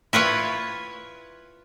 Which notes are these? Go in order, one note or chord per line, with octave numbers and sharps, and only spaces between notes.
E4 F4 B4 C#5